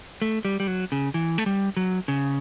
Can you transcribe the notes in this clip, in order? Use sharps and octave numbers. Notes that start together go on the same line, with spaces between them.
A3
G3
G3
F#3
C#3
E3
A3
G3
F#3
C#3